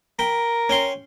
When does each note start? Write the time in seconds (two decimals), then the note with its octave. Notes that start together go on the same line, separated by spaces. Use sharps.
0.19 A#4 G5 B5
0.69 C#4 G5 C6